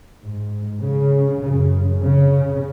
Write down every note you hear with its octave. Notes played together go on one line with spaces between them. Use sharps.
G#2
C#3
F#2 C#3
C#3